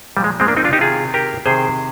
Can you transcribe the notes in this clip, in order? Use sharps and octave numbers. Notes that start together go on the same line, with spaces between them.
A#2 F3 G3
G#3
G#3 C4
A#3 D4
C4 D#4
D4 F4
D#4 G4
C3 D#3 F4 G#4
G4 A#4
C3 D#3 G#4 C5